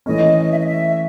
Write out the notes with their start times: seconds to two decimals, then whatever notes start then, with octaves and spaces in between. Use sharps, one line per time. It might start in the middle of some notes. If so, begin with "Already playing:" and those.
0.06 E3 A3 C#4 D#5
0.52 E5
0.59 D#5
0.67 E5